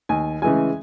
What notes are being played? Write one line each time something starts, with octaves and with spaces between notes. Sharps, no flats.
D#2 G#5
C#3 E3 G#3 G#5